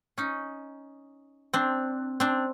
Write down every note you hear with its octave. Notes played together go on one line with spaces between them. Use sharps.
C#4 D#4
C4 D4
C4 D4